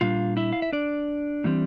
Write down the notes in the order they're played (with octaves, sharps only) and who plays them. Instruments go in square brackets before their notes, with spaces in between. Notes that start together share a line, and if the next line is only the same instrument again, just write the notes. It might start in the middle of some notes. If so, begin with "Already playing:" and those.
[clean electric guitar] A#2 G3 D4 F4 F5
E4 E5
F5
E5
D4 D5
A2 E3 G3 C4